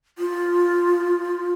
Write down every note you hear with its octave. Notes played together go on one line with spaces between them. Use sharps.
F4